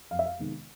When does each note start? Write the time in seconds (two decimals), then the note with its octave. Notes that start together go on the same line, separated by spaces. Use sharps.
0.11 F2 F5
0.19 E5
0.26 F5
0.39 C3 D#3 G#3 B3